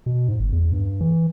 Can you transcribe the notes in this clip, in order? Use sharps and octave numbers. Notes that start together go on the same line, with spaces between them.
B2
G#2
G1
E2
G2
E3